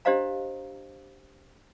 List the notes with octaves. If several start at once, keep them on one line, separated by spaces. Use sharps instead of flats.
D4 G4 C5 D#5 F5 A#5